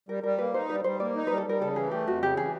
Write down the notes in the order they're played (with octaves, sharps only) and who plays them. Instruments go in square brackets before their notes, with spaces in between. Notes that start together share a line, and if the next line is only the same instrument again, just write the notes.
[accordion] G3 [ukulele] A#4
[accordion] G3 [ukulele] A#4
[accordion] A#3 [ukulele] B4
[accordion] D#4 [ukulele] C5
[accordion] G3 [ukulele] B4
[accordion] G3 [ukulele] C5
[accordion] A#3 [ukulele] D5
[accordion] D#4
[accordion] G3 [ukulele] B4
[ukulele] A4
[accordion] G3 [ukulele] A#4
[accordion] C#3 [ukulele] A4
[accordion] E3 [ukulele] G#4
[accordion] A3 [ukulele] G4
[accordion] F2 [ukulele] F#4
[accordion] C#3 [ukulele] G4
[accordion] E3 [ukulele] G#4